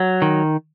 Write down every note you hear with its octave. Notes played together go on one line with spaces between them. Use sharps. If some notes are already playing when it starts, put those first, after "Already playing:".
Already playing: F#3
D#3